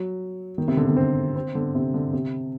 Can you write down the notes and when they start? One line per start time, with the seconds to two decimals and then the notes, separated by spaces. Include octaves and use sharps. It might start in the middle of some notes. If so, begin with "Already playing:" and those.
Already playing: F#3
0.58 D#3
0.68 C3
0.77 D3
0.87 D3
0.96 C4
1.36 C4
1.55 D3
1.75 C3
1.94 D3
2.13 C3